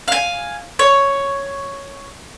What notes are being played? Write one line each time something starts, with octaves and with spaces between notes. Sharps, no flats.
F5 G#5
C#5